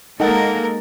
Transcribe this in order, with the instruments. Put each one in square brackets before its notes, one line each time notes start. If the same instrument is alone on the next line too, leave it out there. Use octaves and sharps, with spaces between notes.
[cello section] G#3 A#3 [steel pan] D#4 [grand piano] A4 F#5 A6 [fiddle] A#4